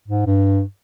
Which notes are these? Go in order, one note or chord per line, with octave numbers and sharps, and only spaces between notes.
G#2
G2